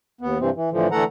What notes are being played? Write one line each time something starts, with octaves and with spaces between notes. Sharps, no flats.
D#2 B3
G2 C3 E3 C4
E3
A2 D3 E3 F3
D3 E3 A3 A4 F#5 A#5